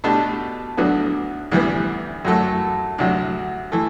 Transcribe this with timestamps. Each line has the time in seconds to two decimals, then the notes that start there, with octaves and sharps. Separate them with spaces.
0.04 B2 A3 D4 G4
0.77 D2 D3 F#3 B3
1.52 D2 C3 E3 G3 B3
2.25 F#2 F#3 A3
2.98 D2 C3 F#3
3.72 E3 A3